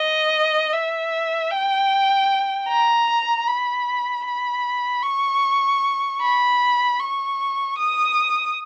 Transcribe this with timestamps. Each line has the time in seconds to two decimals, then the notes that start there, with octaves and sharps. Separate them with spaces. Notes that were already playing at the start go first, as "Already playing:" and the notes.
Already playing: D#5
0.72 E5
1.51 G5
2.68 A#5
3.47 B5
4.26 B5
5.03 C#6
6.21 B5
7.00 C#6
7.78 D#6